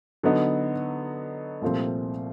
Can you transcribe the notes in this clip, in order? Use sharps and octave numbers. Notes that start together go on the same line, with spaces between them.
D3 F#3 B3 D#4
C2 A#2 F3 A3 C4